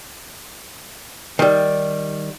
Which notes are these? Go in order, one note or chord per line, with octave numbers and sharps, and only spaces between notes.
D#3 G3